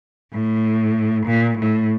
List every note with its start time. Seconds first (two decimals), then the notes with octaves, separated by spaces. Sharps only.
0.33 A2
1.27 A#2
1.59 A2